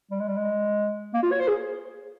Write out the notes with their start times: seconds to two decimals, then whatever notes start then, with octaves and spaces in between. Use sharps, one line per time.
0.11 G3
0.20 G#3
0.28 G3
0.37 G#3
1.14 A#3
1.23 F4
1.32 C#5
1.40 C5
1.48 G#4